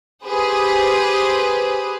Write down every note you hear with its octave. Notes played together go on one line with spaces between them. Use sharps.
G4 G#4 B4 C5